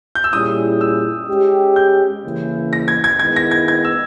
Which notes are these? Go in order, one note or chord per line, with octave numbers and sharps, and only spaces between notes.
G6
E6
A#2 G3 C#4 E4 G#4 D#6
E6
G#3 C#4 G4
G6
C#3 E3 A#3 C#4 E4
A#6
G#6
G#6
D#3 G#3 B3 E4 G#6
A#6
G#6
G#6
E6